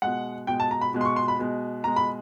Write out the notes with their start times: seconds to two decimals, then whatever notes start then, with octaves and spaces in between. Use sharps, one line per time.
0.02 B2 G#3 F#5
0.47 B2 G#3 G5
0.60 A5
0.71 A#5
0.81 B5
0.94 B2 G#3
1.01 C6
1.05 C#6
1.16 C6
1.28 B5
1.39 B2 G#3
1.84 B2 G#3 A#5
1.96 B5